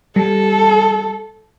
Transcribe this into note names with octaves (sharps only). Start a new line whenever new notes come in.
G3 A4